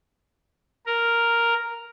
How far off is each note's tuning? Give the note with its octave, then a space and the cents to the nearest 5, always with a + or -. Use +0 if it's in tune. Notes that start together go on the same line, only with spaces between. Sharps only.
A#4 +0